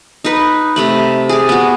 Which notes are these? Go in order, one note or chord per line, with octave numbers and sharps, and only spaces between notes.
D#4 B4
C3 A3 B5
G#4 D5
B3 F#4